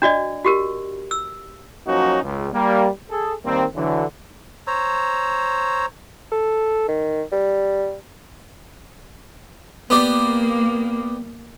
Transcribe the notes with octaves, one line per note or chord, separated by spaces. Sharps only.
D4 F#4 D5 D#5
F#4 G4 A#4
E6
F3 F#3 A#3 C#4 D#4 F#4
C#2
G3 A#3
G#4 A4
D#2 D#3 G3 A#3 C4
D3 E3 F#3
C5 C#5 A#5 E6
A4
D#3
G3
A#3 B3 G4 D5